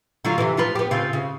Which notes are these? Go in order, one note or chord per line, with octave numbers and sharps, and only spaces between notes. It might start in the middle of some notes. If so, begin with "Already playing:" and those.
D3 F#3 F4
C3 E3
F3 F4 B4
B3 G4
C#3 C4 F4
C#3